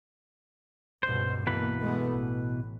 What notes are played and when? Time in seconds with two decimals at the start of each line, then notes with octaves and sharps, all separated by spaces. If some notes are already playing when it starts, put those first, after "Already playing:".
1.03 C#2 G2 B2 C5
1.47 B2 E3 A#3 B4
1.81 G#3 A3 B3
2.11 A1